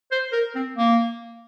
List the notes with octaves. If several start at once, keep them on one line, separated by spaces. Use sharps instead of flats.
C5
A#4
C4
A#3